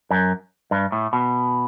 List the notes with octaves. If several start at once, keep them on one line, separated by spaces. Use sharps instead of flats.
F#2
G2
A2
B2